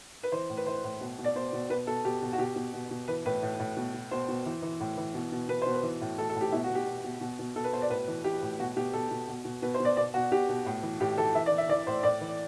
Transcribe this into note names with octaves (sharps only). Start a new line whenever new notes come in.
B4
E3 C5
A2
B4
E3 C5
A2
B2
B2
D5
B2 C5
B2
B2 B4
B2 A4
B2 G4
B2
F#4
B2 G4
B2
B2
B2
E3 B4
A2 B4
A2
A2
B2
B2
B2 C5
B2
E3
E3
A2
E3
B2
B2
B2 B4
B2 C5
B4
E3
A2
A2 A4
A4
A2
G4
B2 E4
F#4
B2
G4
B2
B2
B2
B2
B2 A4
B4
B2 C5
D5
A2 B4
E3
E3 G4
A2
B2 F#4
B2 G4
B2 A4
B2
B2
B2
B2 B4
C5
B2
D5
B2 D5
B2 F#4
B2 G4
B2
A2
E3
A2 G4
E3 A4
E3 E5
D5
E3
E5
E3 D5
A2 C5
A2 D5
E3